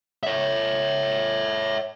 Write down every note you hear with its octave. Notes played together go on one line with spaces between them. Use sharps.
C#5 E5